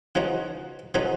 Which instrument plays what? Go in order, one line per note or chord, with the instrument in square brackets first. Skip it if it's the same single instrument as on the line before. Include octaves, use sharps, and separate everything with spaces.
[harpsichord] C#3 F3 B3 D#4 F#4
C#3 F3 B3 D#4 F#4